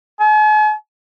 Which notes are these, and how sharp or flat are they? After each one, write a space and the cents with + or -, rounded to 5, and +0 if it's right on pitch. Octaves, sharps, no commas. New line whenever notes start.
G#5 +45